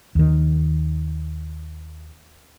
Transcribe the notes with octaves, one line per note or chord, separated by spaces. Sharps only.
D#2 D#3